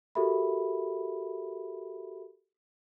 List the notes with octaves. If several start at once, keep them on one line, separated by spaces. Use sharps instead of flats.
F#4 G4 A4 A#4 E5 B5